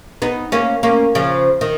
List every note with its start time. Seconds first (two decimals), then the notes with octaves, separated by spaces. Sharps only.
0.22 B3 D#4
0.52 A#3 C#4
0.83 A#3 C#4
1.15 C#3 F3
1.61 D#3